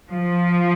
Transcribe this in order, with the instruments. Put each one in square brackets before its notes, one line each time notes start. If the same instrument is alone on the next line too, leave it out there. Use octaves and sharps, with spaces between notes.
[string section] F3